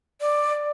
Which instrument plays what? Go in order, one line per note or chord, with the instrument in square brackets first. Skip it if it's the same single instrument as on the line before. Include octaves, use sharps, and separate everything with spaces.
[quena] D5